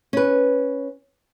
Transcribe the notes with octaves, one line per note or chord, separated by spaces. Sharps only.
C#4 B4